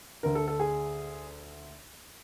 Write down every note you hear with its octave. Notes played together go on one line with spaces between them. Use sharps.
D2 D3 A#4
A4
A4
G#4